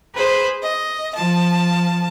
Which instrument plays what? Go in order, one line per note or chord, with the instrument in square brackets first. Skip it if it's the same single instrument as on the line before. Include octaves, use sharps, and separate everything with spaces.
[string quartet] G#4 B4 C5 B5
D#5
F3 A5